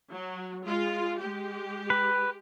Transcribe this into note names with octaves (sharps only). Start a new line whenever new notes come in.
F#3
G#3 F4
G#3 G4
B4